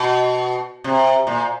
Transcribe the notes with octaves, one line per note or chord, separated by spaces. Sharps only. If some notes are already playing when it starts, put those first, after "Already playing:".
Already playing: B2
C3
A#2